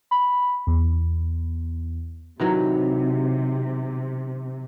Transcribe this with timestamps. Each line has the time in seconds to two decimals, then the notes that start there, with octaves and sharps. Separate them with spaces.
0.11 B5
0.67 E2
2.40 C3 D#3 E3 F#3